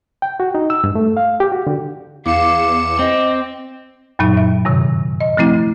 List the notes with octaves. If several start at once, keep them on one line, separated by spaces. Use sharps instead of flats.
G5
F#4
D#4
E6
G2
A3
F5
G4
F#4
D3
E2 F5 D6 C#7 E7
C4 D#5
F#2 A#2 F#3 D#4
E5
G2 C3 D#3
D#5
F3 A3 C4 E4